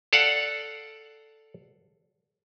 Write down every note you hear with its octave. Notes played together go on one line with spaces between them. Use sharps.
A4 D5 F5 F#5